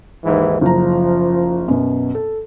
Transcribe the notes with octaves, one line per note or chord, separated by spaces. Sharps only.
D#2 G#2 E3
F#1 F3 A#5
F#2 B2
A4